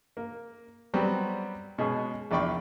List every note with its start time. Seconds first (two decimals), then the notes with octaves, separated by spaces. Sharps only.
0.17 A#3
0.94 F#3 G3 B3 C4
1.78 B2 G#3 C#4 G#4
2.31 A#1 E2 D5 G5 B5 C#6